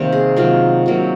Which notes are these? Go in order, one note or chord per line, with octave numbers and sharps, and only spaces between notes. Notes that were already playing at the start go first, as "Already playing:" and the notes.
Already playing: C3 D#3 A#3 C5
G#4
C3 D#3 F#3 A#3 F4
C3 F#3 A#3